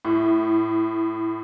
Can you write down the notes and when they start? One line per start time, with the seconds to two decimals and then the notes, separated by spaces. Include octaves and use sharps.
0.05 A2